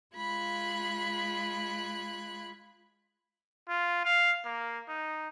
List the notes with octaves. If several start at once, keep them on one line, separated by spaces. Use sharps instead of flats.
G#3 F4 B5 F#6 G#6
F4
F5
A#3
D#4